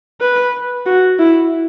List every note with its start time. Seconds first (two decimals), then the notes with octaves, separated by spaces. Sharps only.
0.21 B4
0.86 F#4
1.19 E4